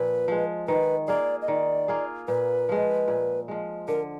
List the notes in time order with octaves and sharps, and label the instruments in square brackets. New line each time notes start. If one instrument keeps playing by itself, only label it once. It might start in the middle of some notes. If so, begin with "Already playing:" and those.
Already playing: [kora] A#2 F3 [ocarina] B4
[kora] F3 G#3
[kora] D#3 [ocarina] B4
[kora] A#3 F4 G#4 [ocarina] D5
[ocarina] D#5
[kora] D#3 [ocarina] D5
[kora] A#3 F4 G#4
[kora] A#2 [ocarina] B4
[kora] F3 G#3
A#2
F3 G#3
[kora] D3 [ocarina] A#4